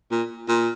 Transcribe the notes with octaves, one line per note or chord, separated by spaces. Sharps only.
A#2
A#2